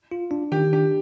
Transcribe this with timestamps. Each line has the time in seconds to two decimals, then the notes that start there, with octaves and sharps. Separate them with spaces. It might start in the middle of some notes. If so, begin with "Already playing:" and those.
0.11 F4
0.31 D4
0.52 D#3 G4
0.73 D4 G4